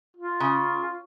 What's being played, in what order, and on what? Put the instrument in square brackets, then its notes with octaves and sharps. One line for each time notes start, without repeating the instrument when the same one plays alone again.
[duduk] F4
[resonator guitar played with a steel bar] C#3